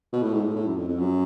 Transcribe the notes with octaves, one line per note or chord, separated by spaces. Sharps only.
B2
A2
G#2
A2
A2
F#2
F2
F2
F#2